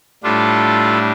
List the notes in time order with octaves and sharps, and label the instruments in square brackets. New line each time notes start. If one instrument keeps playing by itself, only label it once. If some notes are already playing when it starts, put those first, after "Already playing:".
[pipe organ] A2 G3 D4 F4 A4